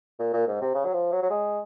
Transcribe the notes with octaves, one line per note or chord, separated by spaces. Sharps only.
A#2
A#2
G#2
C3
C#3
F#3
F3
F#3
F#3
G#3